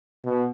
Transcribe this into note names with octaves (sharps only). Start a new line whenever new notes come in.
B2